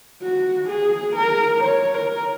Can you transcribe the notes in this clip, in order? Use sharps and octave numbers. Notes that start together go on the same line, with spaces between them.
F#4
G#4
A#4
C#5
A#4